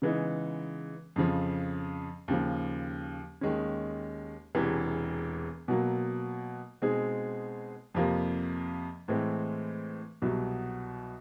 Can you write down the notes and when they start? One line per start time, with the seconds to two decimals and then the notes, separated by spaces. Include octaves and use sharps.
0.02 C#3 E3 G#3 B3 D#4
1.16 F2 C#3 F3
2.28 D#2 C#3 F3
3.41 D#2 D#3 G#3 C#4
4.55 E1 E2 C3 E3
5.68 B2 F#3 A#3
6.82 B2 G#3 C4 D#4 G#4
7.94 F2 C3 F3 A#3
9.08 A2 E3 G#3 C4
10.22 C2 B2 F#3